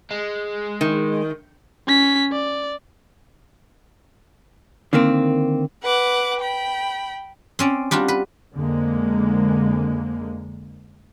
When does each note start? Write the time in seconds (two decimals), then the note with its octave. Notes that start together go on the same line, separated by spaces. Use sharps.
0.11 G#3
0.81 D#3
1.87 C#4 B6
2.32 D5
4.93 D3 D#3 A#3 C4
5.83 B4 F#5 D6
6.41 G5 B5
7.59 C4 C#4 D5
7.91 G3 D4 F4 F#4
8.08 B4
8.54 F2 D3 G#3 A#3